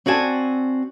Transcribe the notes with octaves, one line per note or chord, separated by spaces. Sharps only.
C4 F#4 D5 G#5 A5